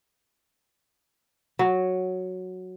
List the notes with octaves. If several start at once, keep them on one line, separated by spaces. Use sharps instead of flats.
F#3